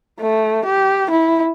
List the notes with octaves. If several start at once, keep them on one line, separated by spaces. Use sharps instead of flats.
A3
G4
E4